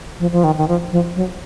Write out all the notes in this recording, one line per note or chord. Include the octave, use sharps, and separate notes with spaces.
F3
F3
D#3
D#3
F3
F3
F#3